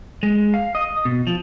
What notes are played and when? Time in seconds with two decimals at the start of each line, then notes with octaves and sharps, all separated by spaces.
0.23 G#3
0.54 F5
0.75 D#5
1.05 B2
1.27 F3